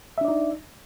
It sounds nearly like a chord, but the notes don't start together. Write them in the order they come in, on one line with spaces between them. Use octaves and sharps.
E5 D4 D5 D#4